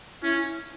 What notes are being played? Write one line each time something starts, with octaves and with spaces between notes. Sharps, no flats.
C#4 E4